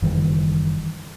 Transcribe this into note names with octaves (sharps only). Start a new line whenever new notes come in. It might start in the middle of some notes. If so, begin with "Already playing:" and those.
F#1 D#3 E3 G3